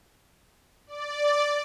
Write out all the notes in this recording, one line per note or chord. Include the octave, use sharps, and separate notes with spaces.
D5